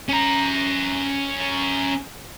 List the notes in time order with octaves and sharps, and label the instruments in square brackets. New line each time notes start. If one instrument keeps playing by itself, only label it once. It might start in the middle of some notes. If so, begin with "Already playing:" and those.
[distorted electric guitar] C#4 A#5